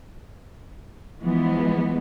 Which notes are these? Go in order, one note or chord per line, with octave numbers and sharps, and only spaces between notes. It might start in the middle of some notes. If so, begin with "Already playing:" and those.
E3 F3 G#3 B3